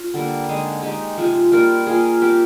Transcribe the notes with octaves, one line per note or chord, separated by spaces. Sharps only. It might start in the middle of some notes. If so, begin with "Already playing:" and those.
Already playing: F4
D3 G3 A#3
D3 G#3 D#4 G#4
G#3 D#4 G4
C3 F3 G#3
G3 A#3 F4 A#4
A#3 F4 G#4
G3 C4 G4 A#4